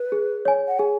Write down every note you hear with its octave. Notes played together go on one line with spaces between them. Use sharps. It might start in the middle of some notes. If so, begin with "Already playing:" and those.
Already playing: B4
G#4
C#5 G#5
F#5
G#4 G#5